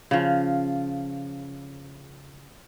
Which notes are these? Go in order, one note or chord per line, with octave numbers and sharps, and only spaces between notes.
C#3 F3